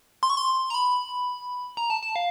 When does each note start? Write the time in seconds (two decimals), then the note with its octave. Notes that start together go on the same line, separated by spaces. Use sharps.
0.23 C6
0.30 C#6
0.37 C6
0.70 A#5
0.74 B5
1.77 A#5
1.90 A5
2.03 A5
2.16 F5